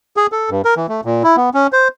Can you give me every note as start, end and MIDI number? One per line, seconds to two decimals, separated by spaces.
0.17 0.27 68
0.32 0.50 69
0.50 0.62 43
0.65 0.74 70
0.77 0.87 52
0.89 1.01 57
1.05 1.23 46
1.24 1.36 64
1.37 1.50 59
1.54 1.67 61
1.73 1.88 72